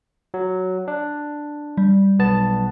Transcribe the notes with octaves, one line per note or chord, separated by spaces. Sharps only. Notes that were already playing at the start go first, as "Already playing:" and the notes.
F#3
D4
G3
B1 B3 A5